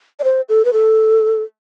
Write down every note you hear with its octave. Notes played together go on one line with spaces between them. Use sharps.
D5
C5
A4
B4
A4